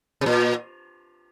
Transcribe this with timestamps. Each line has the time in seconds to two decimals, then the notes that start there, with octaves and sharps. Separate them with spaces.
0.21 C3
0.26 A#2